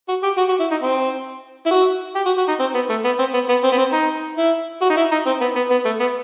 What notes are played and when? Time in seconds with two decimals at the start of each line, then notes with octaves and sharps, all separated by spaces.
0.08 F#4
0.23 G4
0.37 F#4
0.48 F#4
0.60 E4
0.71 D#4
0.82 C4
1.66 E4
1.71 F#4
2.15 G4
2.26 F#4
2.37 F#4
2.48 D#4
2.59 C4
2.74 B3
2.89 A3
3.04 B3
3.19 C4
3.33 B3
3.49 B3
3.63 C4
3.71 B3
3.78 C4
3.92 D#4
4.37 E4
4.81 F#4
4.90 D#4
4.97 E4
5.11 D#4
5.26 C4
5.41 B3
5.55 B3
5.70 B3
5.85 A3
6.00 B3